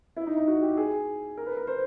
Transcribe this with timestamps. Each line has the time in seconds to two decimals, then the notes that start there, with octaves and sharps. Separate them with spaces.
0.16 E4
0.27 D#4
0.38 D#4
0.47 F#4
0.62 G4
0.77 G#4
1.37 A#4
1.46 B4
1.57 A#4
1.67 C5